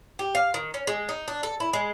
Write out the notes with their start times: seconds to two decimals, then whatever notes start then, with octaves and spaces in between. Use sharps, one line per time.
0.19 G4
0.35 F5
0.54 D#3
0.74 C#4
0.87 G#3
1.09 D#4
1.28 D4
1.43 A4
1.60 E4
1.73 G#3